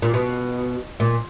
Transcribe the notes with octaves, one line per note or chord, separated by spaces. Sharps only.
A#2
B2
A#2